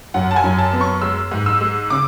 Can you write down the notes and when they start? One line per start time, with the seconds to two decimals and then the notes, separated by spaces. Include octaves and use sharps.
0.14 F#2 F#5
0.31 A5
0.36 G#5
0.44 F#2
0.59 A5
0.73 B3
0.81 C#6
1.02 G#3 E6
1.31 G#2
1.46 E6
1.61 G#3
1.90 C#3 D6